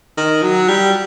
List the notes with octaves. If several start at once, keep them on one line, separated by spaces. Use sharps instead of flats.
D#3
F#3
G3